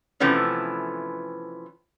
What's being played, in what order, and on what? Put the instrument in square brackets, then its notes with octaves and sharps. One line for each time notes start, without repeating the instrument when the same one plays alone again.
[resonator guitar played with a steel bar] C3 E3 F3 A3 B3 C#4